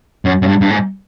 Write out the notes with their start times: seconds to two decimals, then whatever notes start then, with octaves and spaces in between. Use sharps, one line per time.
0.25 F#2
0.42 F#2
0.47 G2
0.61 G2
0.70 G#2